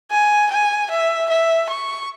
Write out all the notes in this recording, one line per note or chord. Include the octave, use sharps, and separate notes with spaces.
G#5
G#5
E5
E5
C#6